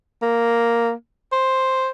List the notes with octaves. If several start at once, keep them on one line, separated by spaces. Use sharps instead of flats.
A#3
C5